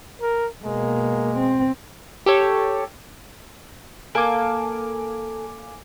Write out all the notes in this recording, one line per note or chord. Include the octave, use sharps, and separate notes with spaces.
A#4
B2 G#3 A#3
C4
G4 A4 C#5
A#3 A4 G#5 D6